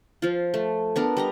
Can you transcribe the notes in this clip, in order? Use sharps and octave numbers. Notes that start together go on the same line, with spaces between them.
F3 F4
A3
B3 D4 A#4
G3 D#5 A#5